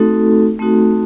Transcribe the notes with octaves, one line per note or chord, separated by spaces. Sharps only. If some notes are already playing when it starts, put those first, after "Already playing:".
Already playing: A3 C4 D#4 F#4 A4
A3 C4 D#4 F#4 A4